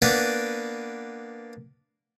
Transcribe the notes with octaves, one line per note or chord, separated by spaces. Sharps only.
A#3 B3 D4 B4 D5 G5